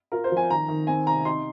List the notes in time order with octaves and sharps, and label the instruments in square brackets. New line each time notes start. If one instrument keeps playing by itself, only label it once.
[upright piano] F4 A#4
C5
F3
G#5
D#3 A#5
D#3
C4 G#5
C3 A#5
D#4 C6